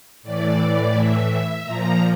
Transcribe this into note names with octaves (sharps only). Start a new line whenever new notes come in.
A2 E3 D5
E5
A#2 F3 A#5